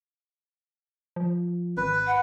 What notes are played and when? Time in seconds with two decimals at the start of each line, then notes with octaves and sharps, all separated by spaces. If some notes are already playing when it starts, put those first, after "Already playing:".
1.16 F3
1.77 G#1 B4
2.07 F#5